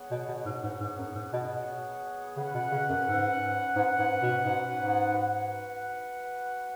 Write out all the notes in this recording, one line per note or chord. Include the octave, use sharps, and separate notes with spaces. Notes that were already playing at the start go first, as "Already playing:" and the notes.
Already playing: B3 G#4 C#5 F#5
B2
B2
G#2
G#2
G#2
F#2
G#2
B2
C#3 C#4 B4 F#5
B2
C#3
F#2
G#2
G#2
G#2
B2
G#2
G#2
F#4 B4 F#5